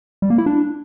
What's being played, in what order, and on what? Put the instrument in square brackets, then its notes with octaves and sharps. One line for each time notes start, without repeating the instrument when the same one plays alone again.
[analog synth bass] G3
A#3
E4
D4